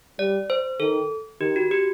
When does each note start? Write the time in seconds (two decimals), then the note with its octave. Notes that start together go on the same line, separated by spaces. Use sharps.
0.19 G3 D5
0.50 C5
0.80 D#3 A4
1.41 D#3 G4
1.56 F#4
1.71 G4